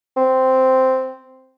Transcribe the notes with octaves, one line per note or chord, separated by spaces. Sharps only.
C4